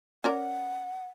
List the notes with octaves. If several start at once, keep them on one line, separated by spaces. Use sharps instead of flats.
C#4 A#4 D5 F#5